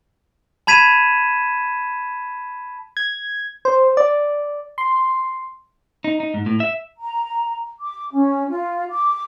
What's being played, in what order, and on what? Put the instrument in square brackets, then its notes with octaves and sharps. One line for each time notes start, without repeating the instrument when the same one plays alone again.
[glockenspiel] A5 B5 G#6 B6 D#7 E7
[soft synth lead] G#6
C5
D5
C6
[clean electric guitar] D#4
D#4
G#2
A2
E5
[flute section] A#5
D6
C#4
F4
D6